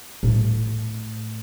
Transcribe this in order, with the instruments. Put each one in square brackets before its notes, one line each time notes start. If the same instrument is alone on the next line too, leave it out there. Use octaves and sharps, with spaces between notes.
[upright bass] A2